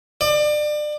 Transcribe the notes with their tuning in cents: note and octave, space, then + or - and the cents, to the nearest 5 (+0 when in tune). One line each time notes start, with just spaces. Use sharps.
D5 +30